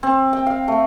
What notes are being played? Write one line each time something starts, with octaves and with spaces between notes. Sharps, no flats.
C4
G5
F5
A3